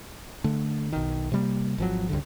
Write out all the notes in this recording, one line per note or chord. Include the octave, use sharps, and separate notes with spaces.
D3 A3
B1 D#3
C3 G3 A#3
G#1 F3 F#3
C#2 G2 D3